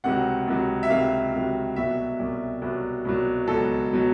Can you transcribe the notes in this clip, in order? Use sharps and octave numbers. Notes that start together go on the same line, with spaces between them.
C#2 C3 D#3 F#3 F#5
C#2 C3 D#3 F#3
E5
C#2 C3 D#3 F#3 F5
C#2 C3 D#3 F#3
C2 B2 F#3 E5
C2 B2 F#3
C2 B2 F#3
C2 B2 F#3
C#2 B2 F#3 A4
B2 F#3